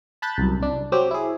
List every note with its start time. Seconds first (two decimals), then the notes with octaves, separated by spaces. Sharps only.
0.22 A5 B5 F#6 G6 A6
0.38 C2 F#2
0.60 C2 D4
0.92 F#3 C4 F#4 G4
1.11 E4 G#4